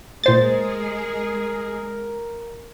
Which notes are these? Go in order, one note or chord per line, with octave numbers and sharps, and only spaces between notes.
A#2 G#3 G#4 A#4 C5 A6